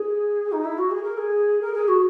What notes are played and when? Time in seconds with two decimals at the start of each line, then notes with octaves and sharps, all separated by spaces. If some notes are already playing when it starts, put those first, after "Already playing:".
Already playing: G#4
0.51 D#4
0.63 E4
0.77 F#4
0.90 G#4
1.02 A#4
1.17 G#4
1.61 A#4
1.73 G#4
1.87 F#4